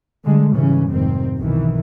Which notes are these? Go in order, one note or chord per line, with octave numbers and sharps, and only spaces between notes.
D3 G3 G#3
G#2 C#3 E3 G3 C#4
F1 G#2 D#3 C4
B1 D#3 E3